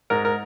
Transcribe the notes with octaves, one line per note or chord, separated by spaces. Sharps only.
G#2 A#4
A#4